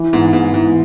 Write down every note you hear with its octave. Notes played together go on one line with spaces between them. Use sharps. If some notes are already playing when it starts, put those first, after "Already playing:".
Already playing: E3
G#2 B3
G#2 B3
G#2 E3